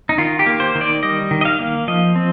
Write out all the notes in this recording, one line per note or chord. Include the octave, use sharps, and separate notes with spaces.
D#4
D#3 F4
G4
A#3
C5
D#3
D5
G3 D#5
D#3
D#5
F5
A#3
F3 D#5
C4